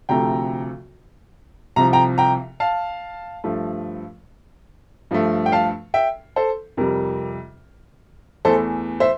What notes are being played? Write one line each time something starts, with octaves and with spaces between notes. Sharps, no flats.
D2 C3 F3 A3 G5 A#5
C2 C3 F3 A#5
G5 A#5
G5 A#5
F5 A5
G2 F3 A3
G2 F3 A3
G5
F5 A5
E5 G5
A4 C5
F2 C3 G3 A#4
E2 E3 A3 A4 C5
C5 E5